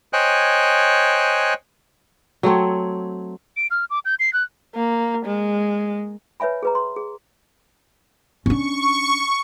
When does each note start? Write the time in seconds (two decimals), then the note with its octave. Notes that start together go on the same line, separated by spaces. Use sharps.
0.13 C5 C#5 D#5 G5 G#5 F#6
2.43 F#3 A3 C4 C#5
3.57 D7
3.71 F6
3.90 D6
4.05 G6
4.19 C7
4.33 F#6
4.75 A#3
5.25 G#3
6.40 B4 C#5 E5 G#5 B5
6.63 G#4 B4 A#5
6.75 C6
6.96 G#4
8.46 C#4 D4 C#6